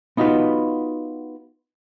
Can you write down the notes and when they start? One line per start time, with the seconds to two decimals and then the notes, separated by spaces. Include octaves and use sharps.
0.17 B3 D#4 F4 F#4 B4